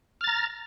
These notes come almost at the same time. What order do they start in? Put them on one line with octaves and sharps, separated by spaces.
F6 A6 A#5